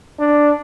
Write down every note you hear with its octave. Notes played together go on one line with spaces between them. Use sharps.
D4